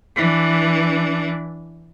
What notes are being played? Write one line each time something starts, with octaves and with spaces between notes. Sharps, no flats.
E3 D4